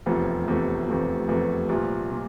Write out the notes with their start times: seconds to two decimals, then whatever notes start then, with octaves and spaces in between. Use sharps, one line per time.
0.06 F1 E2 C3 F3 A3
0.47 F1 E2 C3 F3 A3
0.88 F1 E2 C3 F3 A3
1.29 F1 E2 C3 F3 A3
1.69 C2 A#2 F3
2.11 A#2 F3